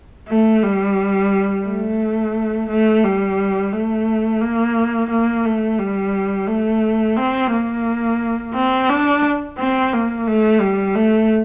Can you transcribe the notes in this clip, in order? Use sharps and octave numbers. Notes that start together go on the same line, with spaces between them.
A3
G3
A3
A3
G3
A3
A#3
A#3
A3
G3
A3
C4
A#3
C4
D4
C4
A#3
A3
G3
A3